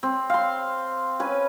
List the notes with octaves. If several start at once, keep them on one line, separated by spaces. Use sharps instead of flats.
C4
F5 C6
C#4 B4 G#5